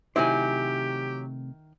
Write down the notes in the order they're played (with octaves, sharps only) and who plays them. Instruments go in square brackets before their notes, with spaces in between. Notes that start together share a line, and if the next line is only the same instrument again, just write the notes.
[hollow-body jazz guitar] C3 A3 C5 [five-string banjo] D#3 E4 [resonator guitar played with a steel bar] F#3 G#5 [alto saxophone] G4